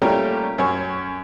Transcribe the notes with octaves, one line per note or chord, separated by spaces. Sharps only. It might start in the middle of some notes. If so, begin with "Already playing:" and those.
A#2 G3 A3 C#4 G4 A#4
F#2 C#4 C#5